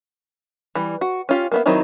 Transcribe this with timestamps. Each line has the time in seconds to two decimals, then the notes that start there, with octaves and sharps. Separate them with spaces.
0.75 E3 G3
1.01 F#4
1.29 C#4 F4 G4
1.52 A#3 B3 E5
1.66 D#3 F#3 C4 D#4 E4